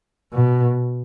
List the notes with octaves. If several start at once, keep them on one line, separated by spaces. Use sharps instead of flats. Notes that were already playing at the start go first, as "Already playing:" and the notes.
B2